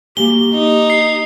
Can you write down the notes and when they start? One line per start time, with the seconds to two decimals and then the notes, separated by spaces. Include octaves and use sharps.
0.17 A#3 F#4 G4 G#5 G7
0.54 D#4
0.90 C7